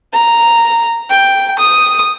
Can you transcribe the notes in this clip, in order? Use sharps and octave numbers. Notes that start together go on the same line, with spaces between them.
A#5
G5
D#6